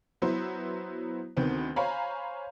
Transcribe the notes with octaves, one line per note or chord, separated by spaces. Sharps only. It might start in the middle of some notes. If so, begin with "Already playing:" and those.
F#3 B3 E4 C5
D2 D#3 B3 C4
C5 C#5 F5 G#5 A#5 B5